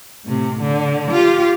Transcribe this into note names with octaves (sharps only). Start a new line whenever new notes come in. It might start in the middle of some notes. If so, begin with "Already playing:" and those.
A2 C3
D3
F4 G4